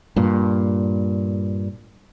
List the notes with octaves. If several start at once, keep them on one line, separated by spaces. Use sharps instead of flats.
G2 A#2